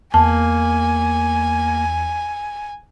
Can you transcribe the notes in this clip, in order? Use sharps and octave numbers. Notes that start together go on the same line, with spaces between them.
E2 A#3 G#5 A5